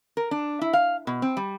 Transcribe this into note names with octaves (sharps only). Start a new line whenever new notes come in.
A#4
D4
E4
F5
B2
C4
G3